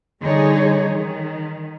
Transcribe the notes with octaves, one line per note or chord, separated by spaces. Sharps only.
D3 G3 D#4 G#4 C#5
D#3